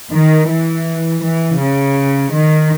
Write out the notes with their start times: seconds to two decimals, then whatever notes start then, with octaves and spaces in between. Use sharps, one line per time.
0.12 D#3
0.48 E3
1.22 E3
1.59 C#3
2.32 D#3